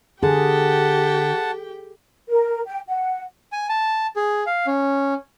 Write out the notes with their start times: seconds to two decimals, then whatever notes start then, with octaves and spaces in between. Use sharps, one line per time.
0.23 D3 G4 G#4 F#5 G5 A5
2.29 A#4
2.66 G5
2.89 F#5
3.52 G#5
3.69 A5
4.16 G#4
4.47 F5
4.67 C#4